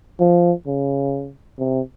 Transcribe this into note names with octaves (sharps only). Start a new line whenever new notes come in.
F3
C#3
C3